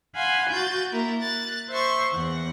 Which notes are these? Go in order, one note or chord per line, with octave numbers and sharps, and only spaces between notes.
F5 F#5 G#5 B5 C6
F#4 G6 A6
A#3 E4 A#4
F#6 A6
C5 E5 C6 C#6
E2 F#5